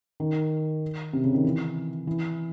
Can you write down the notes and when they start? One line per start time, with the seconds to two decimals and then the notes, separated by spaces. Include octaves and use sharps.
0.20 D#3
1.13 C3
1.24 C#3
1.34 D#3
1.45 E3
2.07 E3